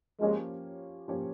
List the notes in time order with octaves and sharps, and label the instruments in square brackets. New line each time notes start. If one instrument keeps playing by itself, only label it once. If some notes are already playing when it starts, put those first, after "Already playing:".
[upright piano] F3 A#3 C#4 G4 C#5 [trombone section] G#3
[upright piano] F3 A#3 C#4 G4 C#5